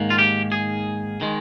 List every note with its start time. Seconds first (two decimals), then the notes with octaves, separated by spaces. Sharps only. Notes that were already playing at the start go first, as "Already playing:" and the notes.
Already playing: G#2 D#3 A#3
0.10 F4
0.18 G4
0.52 G#4
1.21 D#3 G#3